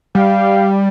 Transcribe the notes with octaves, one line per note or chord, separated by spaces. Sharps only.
G3 G4 F5